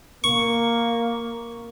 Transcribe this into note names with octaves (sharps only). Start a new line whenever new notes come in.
A#3 C#6